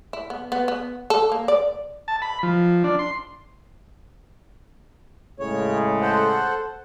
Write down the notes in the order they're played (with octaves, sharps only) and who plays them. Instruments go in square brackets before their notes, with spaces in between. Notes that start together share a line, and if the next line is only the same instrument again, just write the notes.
[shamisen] E4
B3
B3
B3
A4
A#3
D5
[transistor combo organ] A5
B5
F3
D4
C6
[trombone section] A2 C#3 G#3 [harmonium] C#5
[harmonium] A4 C5 F#5